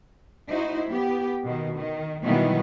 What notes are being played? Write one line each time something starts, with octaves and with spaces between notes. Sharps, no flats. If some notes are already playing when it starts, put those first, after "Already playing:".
D#4 E4 F#4 C5
B3 G4
B2 D#3
D#3
B2 D#3 E3 F#3 G3 B3